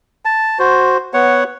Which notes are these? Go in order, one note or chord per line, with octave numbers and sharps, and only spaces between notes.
A5
F#4 C5
B3 C#5 F#5